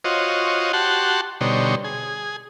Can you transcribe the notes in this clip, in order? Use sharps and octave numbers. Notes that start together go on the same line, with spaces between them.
F4 F#4 C5 C#5 D#5
F#4 G4 F#5 A5 C6
B2 D3 G3 D#4 C5 C#5
G#4